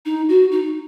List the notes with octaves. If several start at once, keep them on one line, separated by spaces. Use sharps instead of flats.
D#4
F#4
D#4